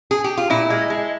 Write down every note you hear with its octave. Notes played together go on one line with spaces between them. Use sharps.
G#4
G4
F4
A#2 E4
G#3
G#3